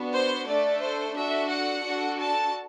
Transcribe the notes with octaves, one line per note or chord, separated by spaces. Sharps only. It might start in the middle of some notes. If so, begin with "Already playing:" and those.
Already playing: B3 D4 F#4
C5
A3 D4 A4 D5
C5
D4 F#4 A4 E5
F#5
D4 F#4 A4
A5